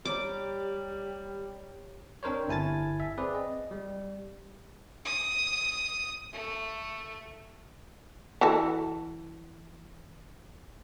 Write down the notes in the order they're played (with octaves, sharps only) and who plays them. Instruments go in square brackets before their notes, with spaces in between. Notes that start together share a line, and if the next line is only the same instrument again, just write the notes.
[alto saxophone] G3 [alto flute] G4 [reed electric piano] C5 C#5 A#5 [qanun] D6
[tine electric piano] C4 D4 A#4 C5 C#5
G1 E4 G#5 A5 A6
E5
C4 G#4 B4 D5
D#5
G3
[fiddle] D#6
A3
[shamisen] E3 F#4 A4